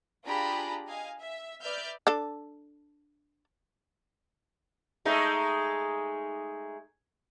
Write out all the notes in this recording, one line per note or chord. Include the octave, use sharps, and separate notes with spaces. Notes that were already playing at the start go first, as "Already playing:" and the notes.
D4 F4 G4 G#4 A#5 B5
D#5 F5 G#5
E5
B4 D5 E5 F6 G6
D4 A4
G#3 A3 D#4